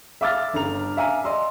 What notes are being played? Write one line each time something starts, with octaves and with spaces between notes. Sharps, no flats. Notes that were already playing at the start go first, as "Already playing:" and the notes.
E5 F5 D6 E6 F6 A6
G1 G2 C#3 A#5 F7
E5 F5 G#5 A#5 F6 D#7
D5 D#5 C6 E6